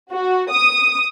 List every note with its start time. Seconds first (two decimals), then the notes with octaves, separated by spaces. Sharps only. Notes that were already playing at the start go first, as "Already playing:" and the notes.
0.11 F#4
0.51 D#6